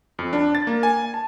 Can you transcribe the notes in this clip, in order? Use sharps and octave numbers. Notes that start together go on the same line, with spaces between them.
F2
D4
A6
A#3
G#5
A5